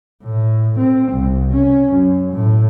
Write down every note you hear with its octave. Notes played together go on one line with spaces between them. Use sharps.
A2
C4
C2
C#4
F#2
A2